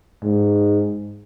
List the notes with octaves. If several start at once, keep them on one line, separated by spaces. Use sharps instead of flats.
G#2